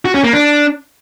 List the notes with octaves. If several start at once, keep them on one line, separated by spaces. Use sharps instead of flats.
F#4
C#4
A#3
D4